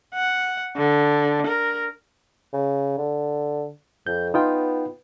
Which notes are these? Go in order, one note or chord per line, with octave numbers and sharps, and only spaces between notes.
F#5
D3
A#4
C#3
D3
F2 G6
B3 D#4 F4 G5